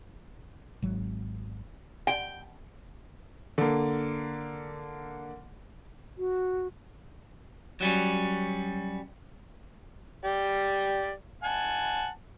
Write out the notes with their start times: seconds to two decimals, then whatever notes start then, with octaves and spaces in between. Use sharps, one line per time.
0.82 G#1 F#3
2.07 G5
3.58 D3 A#3
6.18 F#4
7.81 F#3 G3 C#4
10.25 G4 D5
11.44 F#5 G#5 A5